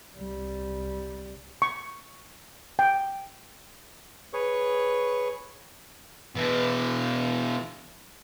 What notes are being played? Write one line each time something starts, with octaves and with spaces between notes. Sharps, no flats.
C2 G3
C#6
G5
G#4 B4 C#5 C#6
B2 E3